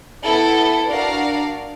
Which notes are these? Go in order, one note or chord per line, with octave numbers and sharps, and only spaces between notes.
B3 E4 A4
D4 F#4 A#4 D5 F5